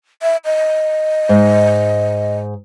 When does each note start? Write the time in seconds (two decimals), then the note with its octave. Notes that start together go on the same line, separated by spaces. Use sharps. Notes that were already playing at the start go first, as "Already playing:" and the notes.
0.22 E5
0.45 D#5
1.29 G#2